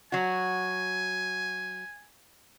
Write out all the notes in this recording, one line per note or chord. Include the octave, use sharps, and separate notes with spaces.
F#3 F#4 G#5